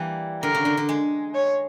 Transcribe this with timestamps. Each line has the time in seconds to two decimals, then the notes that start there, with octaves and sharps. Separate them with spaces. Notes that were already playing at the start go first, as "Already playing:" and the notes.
Already playing: E3 G3 A#3
0.42 D3 A#4
0.55 C#3
0.65 D3
0.77 D3
0.89 G#3
1.35 C#5